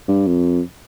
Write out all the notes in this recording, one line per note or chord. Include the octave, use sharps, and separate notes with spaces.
G2
F2